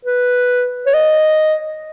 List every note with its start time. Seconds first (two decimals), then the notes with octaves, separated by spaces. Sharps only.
0.05 B4
0.86 C#5
0.94 D#5